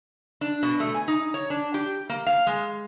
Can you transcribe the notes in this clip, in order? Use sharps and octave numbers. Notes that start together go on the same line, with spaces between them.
D4
B2
A3
G#5
D#4
C#5
D4
G4
A#3
F5
G#3